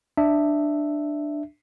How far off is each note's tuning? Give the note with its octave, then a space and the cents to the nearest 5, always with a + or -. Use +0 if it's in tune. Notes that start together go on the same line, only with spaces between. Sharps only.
D4 +10 E5 +0